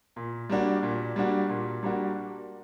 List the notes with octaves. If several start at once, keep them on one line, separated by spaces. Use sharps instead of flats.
A#2
G3 A#3 D4 F#4
A#2
G3 A#3 D4 F#4
A#2
G3 A#3 D4 F#4